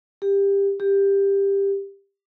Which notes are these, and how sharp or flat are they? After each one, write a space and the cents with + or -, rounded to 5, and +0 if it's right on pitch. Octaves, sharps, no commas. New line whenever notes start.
G4 +20
G4 +15